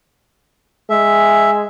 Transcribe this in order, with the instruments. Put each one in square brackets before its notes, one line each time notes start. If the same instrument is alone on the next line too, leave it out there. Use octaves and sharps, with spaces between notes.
[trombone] G#3 [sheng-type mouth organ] E5